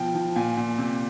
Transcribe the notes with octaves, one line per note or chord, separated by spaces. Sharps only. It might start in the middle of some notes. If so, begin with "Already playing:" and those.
Already playing: B2 F3 G5
F3
A#2 G#5
A#2
C3